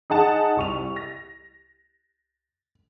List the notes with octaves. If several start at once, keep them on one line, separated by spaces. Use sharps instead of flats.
D#4 G#4 F#5 A5
C2 C#6 F7
A#6